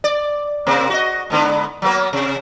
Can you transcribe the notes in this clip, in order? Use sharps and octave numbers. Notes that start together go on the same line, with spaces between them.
D5
C3 A#3 C4
F#4 D#5
G#2 D3 B3
F#3 A#3 B3
C3